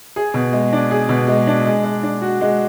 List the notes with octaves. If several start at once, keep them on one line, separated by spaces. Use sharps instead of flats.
G#4
B2
G#3
D4
G#4
B2
G#3
D4
G#3
G#3
D4
F#4
G#3